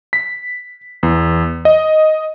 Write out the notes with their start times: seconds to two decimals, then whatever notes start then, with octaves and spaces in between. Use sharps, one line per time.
0.13 B6
1.03 E2
1.65 D#5